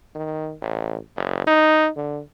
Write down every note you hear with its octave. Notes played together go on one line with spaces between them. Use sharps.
D#3
A1
F#1
D#4
D3